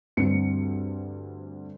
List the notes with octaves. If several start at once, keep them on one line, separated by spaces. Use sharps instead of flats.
D2 G2 C4 C#7